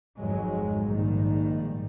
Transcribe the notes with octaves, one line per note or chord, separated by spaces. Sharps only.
G#1 F2 F#3 G#3
A#1 G#2 D#3 G3